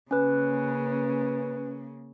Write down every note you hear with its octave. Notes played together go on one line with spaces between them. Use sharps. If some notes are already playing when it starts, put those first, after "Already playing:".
C#3 A#3 C#4 B4